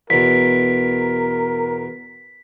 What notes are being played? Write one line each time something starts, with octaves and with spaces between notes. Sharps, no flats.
E2 B2 A#4 B6